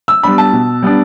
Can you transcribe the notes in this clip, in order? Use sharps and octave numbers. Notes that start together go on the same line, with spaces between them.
E6
G3 B3 D4 B5
A5
B2
G3 B3 D4